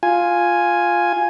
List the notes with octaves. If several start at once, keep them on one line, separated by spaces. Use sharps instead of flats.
F4 G#5